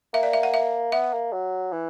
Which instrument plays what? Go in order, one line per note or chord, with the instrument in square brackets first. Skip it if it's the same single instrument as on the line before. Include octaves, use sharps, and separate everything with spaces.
[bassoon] A#3 [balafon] E5
[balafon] D5
E5
F#5
E5
[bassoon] B3 [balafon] E5
[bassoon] A#3
F#3
E3